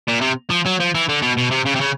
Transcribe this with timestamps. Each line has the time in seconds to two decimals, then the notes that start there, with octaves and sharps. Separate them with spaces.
0.08 A#2
0.21 C3
0.50 F3
0.66 F#3
0.80 F3
0.95 E3
1.09 D3
1.22 B2
1.38 B2
1.51 C3
1.66 C#3
1.76 C3
1.81 C#3